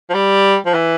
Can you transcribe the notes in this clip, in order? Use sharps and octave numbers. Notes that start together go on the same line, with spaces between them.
F3
G3
F3
E3